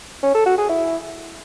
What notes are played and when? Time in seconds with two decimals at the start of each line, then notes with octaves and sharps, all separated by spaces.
0.23 C#4
0.34 A4
0.46 F#4
0.58 G#4
0.69 E4